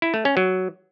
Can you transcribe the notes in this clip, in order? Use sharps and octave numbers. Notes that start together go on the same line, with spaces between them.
E4
A3
C#4
F#3